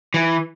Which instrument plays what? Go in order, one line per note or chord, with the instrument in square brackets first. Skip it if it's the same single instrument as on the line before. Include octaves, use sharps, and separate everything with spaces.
[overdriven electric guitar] E3